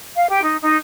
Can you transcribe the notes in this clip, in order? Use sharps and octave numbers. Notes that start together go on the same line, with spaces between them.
F5
G4
D#4
D#4